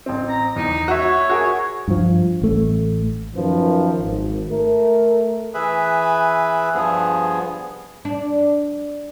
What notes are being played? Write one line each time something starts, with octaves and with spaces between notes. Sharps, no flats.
A1 C4
A#5
E2 D#4
F#4 C#5 E5
F#4 G#4 A#4
G2 F3
A1 A3
F#2 D#3 F3 B4
G#1
A3 A#4
E3 G#4 B4 E5 B5
G2 F3 B3 G#4
D4